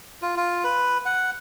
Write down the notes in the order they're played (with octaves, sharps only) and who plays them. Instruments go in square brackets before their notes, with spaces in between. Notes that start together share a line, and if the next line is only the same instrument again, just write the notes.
[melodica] F4
F4
B4
F#5